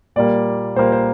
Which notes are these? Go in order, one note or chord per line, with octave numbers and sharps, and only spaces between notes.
A#2 G3 A#3 D5
A#2 G3 A#3 C5
C5